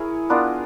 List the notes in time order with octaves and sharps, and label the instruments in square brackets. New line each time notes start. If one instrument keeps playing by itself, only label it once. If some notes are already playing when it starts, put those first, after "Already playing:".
Already playing: [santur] E4 G#4 A#4 C#5
B3 D4 F4 A#4